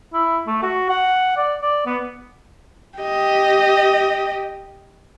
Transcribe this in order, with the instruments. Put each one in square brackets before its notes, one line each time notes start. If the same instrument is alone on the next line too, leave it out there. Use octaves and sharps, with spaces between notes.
[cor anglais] E4
A3
F#4
F#5
D5
D5
B3
[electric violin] G4 D#5